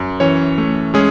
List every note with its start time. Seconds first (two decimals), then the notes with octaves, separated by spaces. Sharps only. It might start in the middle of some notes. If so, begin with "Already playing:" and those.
Already playing: F#2
0.20 E3 C#4 C#5
0.58 A3
0.94 G#3 C#4 G#4